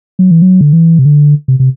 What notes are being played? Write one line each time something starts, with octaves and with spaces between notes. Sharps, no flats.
F#3
E3
F#3
D3
E3
C3
D3
C3
C3